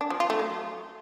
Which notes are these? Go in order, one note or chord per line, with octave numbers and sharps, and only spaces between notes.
D4
F3
F4
A3
F#3